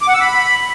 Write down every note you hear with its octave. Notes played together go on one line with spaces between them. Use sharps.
D6
F#5
E6
B5